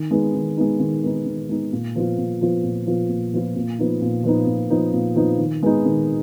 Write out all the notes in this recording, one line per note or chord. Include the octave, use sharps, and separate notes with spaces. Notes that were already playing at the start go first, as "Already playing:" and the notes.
Already playing: D#3
G#3 B3 D#4
D#3
G#3 B3 D#4
D#3
G#3 B3 D#4
D#3
G#3 B3 D#4
A#2
F3 B3 F4
A#2
F3 B3 F4
A#2
F3 B3 F4
A#2
F3 B3 F4
A#2
F3 B3 D#4
A#2
F3 B3 D#4
A#2
F3 B3 D#4
A#2
F3 B3 D#4
D#3
G#3 B3 D#4
D#3